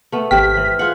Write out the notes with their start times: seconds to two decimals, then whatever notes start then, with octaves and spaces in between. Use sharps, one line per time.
0.12 A3 B3
0.31 G#1 G4 C5 G5 F6 B6
0.57 E3 C5
0.79 F4 G#4 F#5